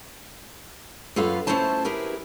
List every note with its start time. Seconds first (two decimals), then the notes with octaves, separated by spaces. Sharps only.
1.16 F#2 F4 A4 B4 F5
1.47 A3 C#4 E4 F4 C5 A5
1.85 E4 G4 G#4 A#4 B4